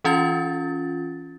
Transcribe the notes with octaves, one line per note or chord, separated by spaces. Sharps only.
E3 C#4 F4 A6